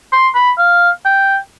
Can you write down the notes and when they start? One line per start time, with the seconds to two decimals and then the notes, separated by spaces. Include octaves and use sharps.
0.13 C6
0.35 B5
0.58 F5
1.05 G5